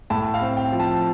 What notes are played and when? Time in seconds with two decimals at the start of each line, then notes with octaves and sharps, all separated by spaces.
0.10 A2 A5
0.34 F5
0.41 C4
0.57 G5
0.72 F3
0.80 A5